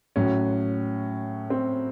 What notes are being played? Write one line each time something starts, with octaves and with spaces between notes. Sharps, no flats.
A2 F#3 C#4
C4